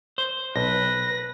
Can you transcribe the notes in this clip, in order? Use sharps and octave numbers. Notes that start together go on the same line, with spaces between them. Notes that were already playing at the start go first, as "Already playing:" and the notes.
C5
B1 B4 A#6